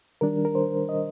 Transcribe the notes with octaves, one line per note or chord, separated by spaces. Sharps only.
D#3 G3 D4 A#4
A#4
C5
D#5